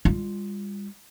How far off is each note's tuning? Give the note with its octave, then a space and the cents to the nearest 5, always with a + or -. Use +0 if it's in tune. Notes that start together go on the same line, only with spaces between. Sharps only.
G3 +40 F4 +0